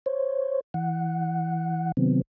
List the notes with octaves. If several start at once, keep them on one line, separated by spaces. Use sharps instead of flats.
C5 C#5
E3 F#5
C3 D#3 F#3 B3 C4